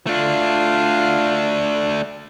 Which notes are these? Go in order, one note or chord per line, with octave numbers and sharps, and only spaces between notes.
A3 D4 F4